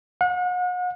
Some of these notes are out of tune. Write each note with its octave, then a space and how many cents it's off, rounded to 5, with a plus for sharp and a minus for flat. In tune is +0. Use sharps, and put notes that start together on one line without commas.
F#5 -40